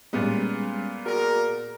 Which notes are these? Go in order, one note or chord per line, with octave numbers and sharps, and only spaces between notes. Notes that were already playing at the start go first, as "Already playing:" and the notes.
A#2 G3 G#3 B3 C#4
F#4 G#4 A#4 D5